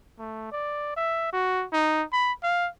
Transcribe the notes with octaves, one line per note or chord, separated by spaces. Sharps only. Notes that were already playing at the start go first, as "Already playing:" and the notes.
A3
D5
E5
F#4
D#4
B5
F5